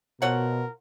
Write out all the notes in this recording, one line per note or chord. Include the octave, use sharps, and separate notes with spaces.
B2 F3 A#4 C#5 F#5